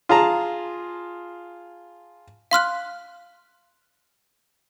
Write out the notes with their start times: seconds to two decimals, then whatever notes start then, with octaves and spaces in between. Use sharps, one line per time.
0.09 F4 G#4 A5 A#5
2.51 F5 C6 F6 F#6